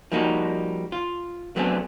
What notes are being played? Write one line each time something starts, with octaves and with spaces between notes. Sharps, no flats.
F3 G3 A#3 D#4 F#4
F4
F#3 A3 B3 C4 D4 G#4